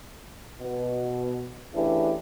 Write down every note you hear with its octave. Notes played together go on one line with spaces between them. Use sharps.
B2
C#3 E3 A3 D4 E4 G4